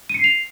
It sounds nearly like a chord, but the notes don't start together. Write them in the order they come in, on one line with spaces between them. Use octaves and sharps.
D#7 C#7 C7 F7